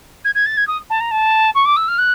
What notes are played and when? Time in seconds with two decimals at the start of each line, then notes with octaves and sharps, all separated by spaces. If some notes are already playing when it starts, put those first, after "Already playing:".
0.24 G#6
0.35 G#6
0.46 A6
0.57 G#6
0.67 D#6
0.90 A5
1.00 A#5
1.11 A5
1.55 C#6
1.65 D6
1.76 E6
1.88 F6
1.98 F#6